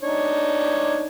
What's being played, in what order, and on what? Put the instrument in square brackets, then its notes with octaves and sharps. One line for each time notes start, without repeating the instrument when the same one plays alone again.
[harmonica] D4 D#4 C#5